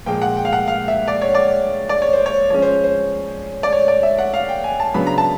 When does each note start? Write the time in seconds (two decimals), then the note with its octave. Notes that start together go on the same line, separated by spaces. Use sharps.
0.06 A#2 F3 G#3 G5
0.22 F#5
0.37 G5
0.45 F5
0.53 F#5
0.68 F5
0.88 E5
1.08 D5
1.22 C#5
1.35 D5
1.89 D5
2.02 C#5
2.13 C5
2.26 C#5
2.50 F3 G#3 C#4 C#5
2.62 C5
2.84 C5
3.63 D5
3.72 C#5
3.88 D5
4.03 E5
4.18 F#5
4.34 F5
4.48 G5
4.64 G#5
4.80 A5
4.94 C#3 F#3 B3 D4 B5
5.07 A#5
5.18 A5